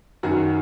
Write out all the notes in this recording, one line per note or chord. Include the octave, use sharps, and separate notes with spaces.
F#2 D#3 F#3 F#4